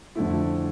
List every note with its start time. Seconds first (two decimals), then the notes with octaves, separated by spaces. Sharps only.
0.15 F2 D3 A3 E4